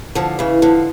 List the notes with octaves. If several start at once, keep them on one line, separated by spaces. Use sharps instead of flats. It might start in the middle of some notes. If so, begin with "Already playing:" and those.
D3 F3
C#3 E3
D3 F3